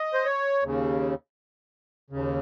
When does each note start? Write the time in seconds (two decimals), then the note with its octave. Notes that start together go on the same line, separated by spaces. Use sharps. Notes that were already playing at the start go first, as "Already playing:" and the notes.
Already playing: D#5
0.14 C5
0.25 C#5
0.63 D#2 C#3
2.10 D#2 C#3